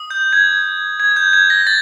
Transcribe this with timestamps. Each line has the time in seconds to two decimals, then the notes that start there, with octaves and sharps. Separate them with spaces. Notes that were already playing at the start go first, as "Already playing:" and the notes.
Already playing: D#6
0.10 G6
0.33 G#6
1.00 G#6
1.12 G#6
1.16 G6
1.33 G#6
1.50 A#6
1.67 A6